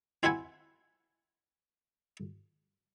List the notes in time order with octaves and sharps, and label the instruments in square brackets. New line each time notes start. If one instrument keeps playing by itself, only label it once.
[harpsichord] C4 E4 E5 F#5 G#5